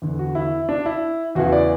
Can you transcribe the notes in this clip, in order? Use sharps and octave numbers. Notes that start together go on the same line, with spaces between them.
E2 D3
F#4
E4
D4
E4
E2 C#3 E3 F#4
D5